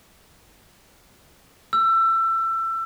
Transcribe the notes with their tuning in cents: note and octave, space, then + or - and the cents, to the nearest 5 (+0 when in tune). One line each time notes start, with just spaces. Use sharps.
E6 +25